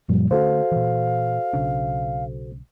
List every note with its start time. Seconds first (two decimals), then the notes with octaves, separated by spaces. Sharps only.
0.09 F#2 A#2 F3 G3
0.31 D3 A3 C#4 F#4 A4 C5 F5
0.72 A#2 E3
1.53 B1 C#3 D4